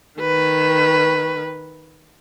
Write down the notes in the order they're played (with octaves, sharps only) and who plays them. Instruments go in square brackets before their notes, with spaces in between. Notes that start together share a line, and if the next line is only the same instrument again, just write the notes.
[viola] D#3 B4